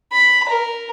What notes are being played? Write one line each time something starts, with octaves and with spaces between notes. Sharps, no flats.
B5
A#4